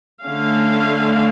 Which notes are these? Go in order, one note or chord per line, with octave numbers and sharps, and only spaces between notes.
D3 A3 C#4 F5